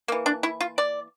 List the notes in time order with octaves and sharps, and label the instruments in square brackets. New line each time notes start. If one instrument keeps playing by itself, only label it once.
[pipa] E3 A#3
D4
E4
F4
D5